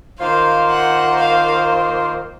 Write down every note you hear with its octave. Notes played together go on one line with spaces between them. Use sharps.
D#3 A#3 F4 C5 F5
F#5
F5